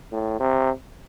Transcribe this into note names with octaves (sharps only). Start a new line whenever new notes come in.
A2
C3